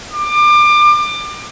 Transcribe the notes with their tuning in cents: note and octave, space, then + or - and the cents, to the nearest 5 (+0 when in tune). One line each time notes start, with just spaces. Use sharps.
D6 +30